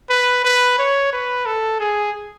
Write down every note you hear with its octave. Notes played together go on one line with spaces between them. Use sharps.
B4
B4
C#5
B4
A4
G#4